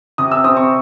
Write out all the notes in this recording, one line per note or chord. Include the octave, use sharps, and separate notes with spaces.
C3 D#6
E6
C4 D#6
C#6